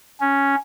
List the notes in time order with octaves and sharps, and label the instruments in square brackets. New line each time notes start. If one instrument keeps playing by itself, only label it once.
[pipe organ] C#4